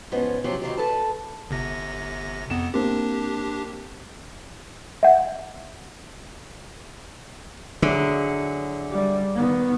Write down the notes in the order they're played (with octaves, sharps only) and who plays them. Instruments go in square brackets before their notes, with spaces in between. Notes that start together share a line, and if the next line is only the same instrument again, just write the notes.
[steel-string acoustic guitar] G#2 F3 B3 C#4
C3 F3 F#3 C#4 F4 G4
D#3 E3 F#3 F4 G4
A4 B4 A5
[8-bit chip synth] G1 C3 A#6
[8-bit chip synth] F2 B3 [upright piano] E7
[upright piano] A#3 C4 [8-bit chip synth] D4 G4
[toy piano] E5 F#5
[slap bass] D3 [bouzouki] F#3 E4 G#4
[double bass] G3
D#3 B3